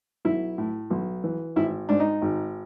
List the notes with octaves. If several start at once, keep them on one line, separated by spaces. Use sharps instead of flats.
B1 E4
A2
B1
E3
G#1 E4
G#2 D4
D#4
G#1